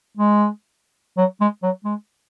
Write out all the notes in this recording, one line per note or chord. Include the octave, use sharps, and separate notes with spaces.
G#3
F#3
G#3
F#3
G#3